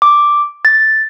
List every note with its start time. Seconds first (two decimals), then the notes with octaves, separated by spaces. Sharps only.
0.02 D6
0.65 A6